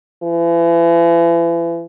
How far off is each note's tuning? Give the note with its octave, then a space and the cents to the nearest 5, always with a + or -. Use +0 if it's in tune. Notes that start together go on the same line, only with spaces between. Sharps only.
E3 +40